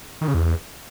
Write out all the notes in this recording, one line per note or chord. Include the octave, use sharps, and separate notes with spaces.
D#3
C#3
E2